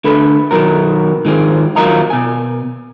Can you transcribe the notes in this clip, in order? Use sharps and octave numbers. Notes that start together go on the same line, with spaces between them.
D3 A3 B4
B1 D#3 F#3 B3 A#4
G#2 D#3 F3 G#4
D#2 F#3 F4 A#4 D#5 A#5
B2 G#5